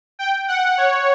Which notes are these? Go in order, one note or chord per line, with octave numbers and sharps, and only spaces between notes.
G5
F#5
C#5